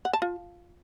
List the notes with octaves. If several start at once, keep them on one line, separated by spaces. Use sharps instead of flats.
F#5
A5
F4